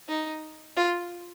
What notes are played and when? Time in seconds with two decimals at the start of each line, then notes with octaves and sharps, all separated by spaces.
0.08 D#4
0.76 F4